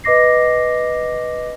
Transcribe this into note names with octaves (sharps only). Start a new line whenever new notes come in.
B4 D#5 D6 A#6 C7